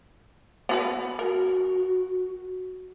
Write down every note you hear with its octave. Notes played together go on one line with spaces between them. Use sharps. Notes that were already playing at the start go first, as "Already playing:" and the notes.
B3 F#4 B4
F#4 A#4